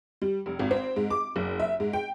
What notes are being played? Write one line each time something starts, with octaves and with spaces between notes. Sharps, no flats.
G3
F1
G#1
C4
G#2
D6
F#1
E5
G#2
G5